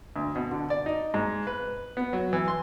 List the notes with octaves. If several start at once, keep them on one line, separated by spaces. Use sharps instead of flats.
D2
B2
D3
D5
D#4
G#2
B4
B3
F#3
E3
C6